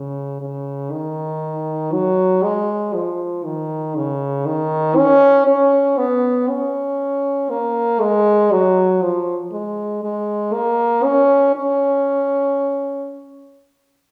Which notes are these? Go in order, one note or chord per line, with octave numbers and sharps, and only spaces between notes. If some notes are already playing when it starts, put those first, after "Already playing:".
Already playing: C#3
C#3
D#3
F#3
G#3
F3
D#3
C#3
D#3
C#4
C#4
B3
C#4
A#3
G#3
F#3
F3
G#3
G#3
A#3
C#4
C#4